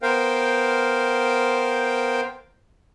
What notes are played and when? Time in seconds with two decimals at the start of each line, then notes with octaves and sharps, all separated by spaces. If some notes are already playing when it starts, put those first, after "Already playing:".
0.02 B3 A#4 C5 F5 G5